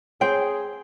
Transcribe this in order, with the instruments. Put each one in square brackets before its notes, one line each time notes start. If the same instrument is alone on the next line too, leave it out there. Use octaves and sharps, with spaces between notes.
[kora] C4 C5 [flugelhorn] G#4 [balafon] C#5 [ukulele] G5